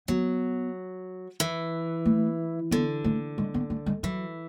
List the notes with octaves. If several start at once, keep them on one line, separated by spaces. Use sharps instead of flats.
F#3 B3
E3
A3
D3 B3
A3
G#3
B3
A3
G#3
E3 F#3